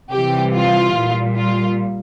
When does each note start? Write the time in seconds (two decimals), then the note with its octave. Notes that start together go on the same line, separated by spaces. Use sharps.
0.11 C3 E3 G3 G4
0.53 F4
0.96 A#2 G3
1.37 F4